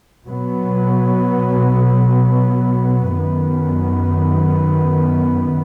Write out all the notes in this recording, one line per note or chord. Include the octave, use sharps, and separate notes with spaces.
B2 F#3 B3
F#2 D#3 B3